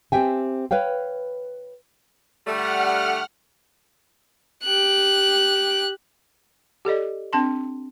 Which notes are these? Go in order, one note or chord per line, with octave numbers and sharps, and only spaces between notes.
C4 G4 E5 G5 G#5
B4 C#5 F5 G5
D3 G3 A3 F#5 F6
G4 F#6
G4 A4 D5 D#5
C4 D4 A5 C6